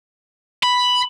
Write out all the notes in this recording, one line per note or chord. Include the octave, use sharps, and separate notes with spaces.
B5